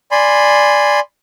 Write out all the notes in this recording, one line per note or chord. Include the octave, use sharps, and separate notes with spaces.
D5 G#5 B5 C6